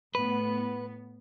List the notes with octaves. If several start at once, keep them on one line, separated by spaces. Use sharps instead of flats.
A2 B3 B4